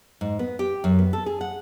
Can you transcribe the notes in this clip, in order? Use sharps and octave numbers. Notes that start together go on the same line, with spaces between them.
G#2
B3
G4
F#2
B3
A4
G#4
F#5